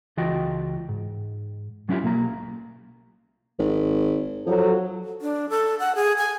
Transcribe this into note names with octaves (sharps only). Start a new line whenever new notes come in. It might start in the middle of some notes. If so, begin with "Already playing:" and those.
C#2 E3 F4 F#4 D#5 G5
G#2
F#3 C#4 D4 E4 F4 G4
B1 A#3 A#5
G#1
F3 F#3 A4
D4
A4
F#5
G#4
G#5